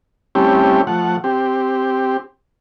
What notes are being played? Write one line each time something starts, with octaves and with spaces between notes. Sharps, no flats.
G3 A3 C4 C#4 E4 G4
F3 A3 F#5
C4 G4